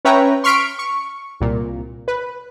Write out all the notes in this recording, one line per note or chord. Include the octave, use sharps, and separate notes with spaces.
C#4 B4 C#5 E5 G5 A#5
C6 C#6 F6 B6 D7
C#6
C2 A#2
B4